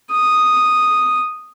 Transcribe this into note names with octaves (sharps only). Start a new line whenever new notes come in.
D#6